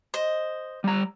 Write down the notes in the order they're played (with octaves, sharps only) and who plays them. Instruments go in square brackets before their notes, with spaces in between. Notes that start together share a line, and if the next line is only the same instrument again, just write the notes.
[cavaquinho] C5 D#5
[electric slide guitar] G3 A#5